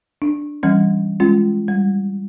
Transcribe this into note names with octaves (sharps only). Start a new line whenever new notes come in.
D4
E3 G3 C#4
G#3 C#4 F4
G3